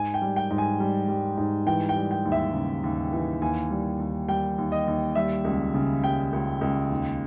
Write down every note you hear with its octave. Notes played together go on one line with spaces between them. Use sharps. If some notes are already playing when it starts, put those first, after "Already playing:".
Already playing: G#2 G#5
G5
G3
G5
G#2
G#5
G3
G3
G#2
E3 G5
G5
G3
G5
D#2
E5
C#3
D#2
E3
D#2 G#5
G3
D#2
G3 G5
D#2
D#5
D#2
G3 E5
C#2
C#3
G3 G5
C#2
C#2
D#2